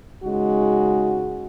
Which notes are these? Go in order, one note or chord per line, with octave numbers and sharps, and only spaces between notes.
C#3 G#3 D#4 F#4